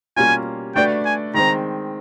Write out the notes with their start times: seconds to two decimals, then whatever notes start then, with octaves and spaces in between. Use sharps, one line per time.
0.17 B2 G3 A#3 C#4 F4 G#5
0.75 A3 D4 F#4 B4 D5 G5
1.05 G#5
1.34 D#3 G#3 C4 A#5